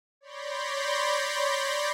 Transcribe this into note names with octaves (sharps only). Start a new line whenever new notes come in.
C#5 D5 B5 C6 G6 A#6